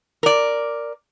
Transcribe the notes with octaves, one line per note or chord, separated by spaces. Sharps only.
A#4 D5